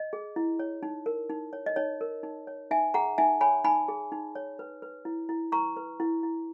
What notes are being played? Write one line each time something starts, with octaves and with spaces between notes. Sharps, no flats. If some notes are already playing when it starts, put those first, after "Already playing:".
Already playing: D#5
G#4
E4
C#5
D#4
A#4
D#4
C#5
D#5
D#4 C#5
A#4
D#4
C#5
D#4 E5 G#5
G#4 F#5 A#5
D#4 E5 G#5
C#5 G#5 B5
D#4 G#5 B5
G#4
D#4
C#5
B4
B4
E4
E4
B4 A#5 C#6
B4
E4
E4